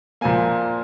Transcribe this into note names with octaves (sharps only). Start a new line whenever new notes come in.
A#2 F3 A#3 G#5